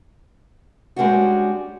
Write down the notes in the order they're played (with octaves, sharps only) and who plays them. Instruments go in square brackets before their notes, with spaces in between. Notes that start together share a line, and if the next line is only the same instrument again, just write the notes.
[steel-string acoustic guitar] G3 G#3 A#3 C#4 D4 F#4